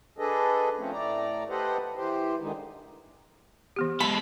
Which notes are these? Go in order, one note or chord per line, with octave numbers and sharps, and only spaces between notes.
D4 G#4 A4 B4 D#5
F3 A3 C4 C#4
A2 A3 D5 A#5
G4 A4 B4 C5 D#5 F#5
E3 G4 C5
D3 D#3 G#3 D#4
E3 B3 G4
G#3 A4 B5